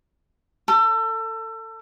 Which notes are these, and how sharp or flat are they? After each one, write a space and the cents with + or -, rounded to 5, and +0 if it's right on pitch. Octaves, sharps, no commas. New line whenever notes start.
A4 +30